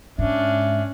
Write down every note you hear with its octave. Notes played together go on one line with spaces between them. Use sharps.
G#2 C#4 D4 E5